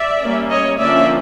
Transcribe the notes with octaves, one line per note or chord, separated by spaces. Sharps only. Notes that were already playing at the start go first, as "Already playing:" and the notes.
Already playing: D5 E5
G3 A#3 C#4
C#5 D#5
D3 F3 A#3 C#4 D5 E5